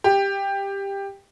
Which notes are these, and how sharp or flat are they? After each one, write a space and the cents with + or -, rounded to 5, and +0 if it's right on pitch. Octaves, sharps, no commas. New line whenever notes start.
G4 +10